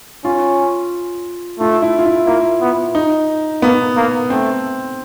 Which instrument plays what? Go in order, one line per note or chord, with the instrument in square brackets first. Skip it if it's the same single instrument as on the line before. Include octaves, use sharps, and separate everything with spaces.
[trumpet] C#4 [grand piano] F4
[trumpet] A3 [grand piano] F4
[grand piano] E4
F4
E4
[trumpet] A#3 [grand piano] E4
[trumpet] B3
[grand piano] D#4
[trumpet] A#3 [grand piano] B3
[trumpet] A#3
[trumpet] A3 [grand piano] C4